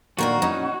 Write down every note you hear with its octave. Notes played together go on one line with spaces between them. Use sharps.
A#2 D#3 A#3 D4 F#4 A#4 F5
C#4 D#4 E4 D#5